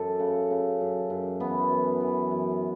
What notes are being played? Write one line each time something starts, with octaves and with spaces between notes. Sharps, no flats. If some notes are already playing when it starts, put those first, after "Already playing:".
Already playing: F#2 A4
C#3
C#3
F#2
F#2
E3 B3
F#2
E3
F#2